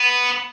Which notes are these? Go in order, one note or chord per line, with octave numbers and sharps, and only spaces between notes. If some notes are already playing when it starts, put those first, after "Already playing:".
Already playing: B3